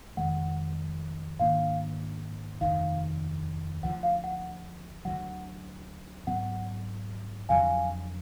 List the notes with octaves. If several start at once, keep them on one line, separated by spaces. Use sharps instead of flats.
F1 F2 D#3 G#3 F#5
G#2 D#3 A#3 D4 F5
F1 D#2 D#3 F5
D2 D3 F3 F#5
F5
F#5
D2 D3 F#3 F#5
G#2 F#3 B3 F#5
F2 D3 F#3 F5 G#5